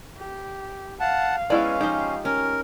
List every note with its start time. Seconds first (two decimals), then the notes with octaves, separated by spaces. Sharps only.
0.17 G4
1.00 F5 F#5 A5
1.50 G#3 B3 C#4 E4 D5
1.81 F3 D#4 G4 C5
2.25 C#4 A#4